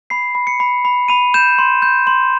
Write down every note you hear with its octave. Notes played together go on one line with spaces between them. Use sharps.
B5 C7
B5
C#7
B5
B5
B5 D#7
G6 E7
C6
G6
C6